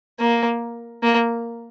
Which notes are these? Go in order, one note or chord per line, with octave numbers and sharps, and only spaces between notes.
A#3
A#3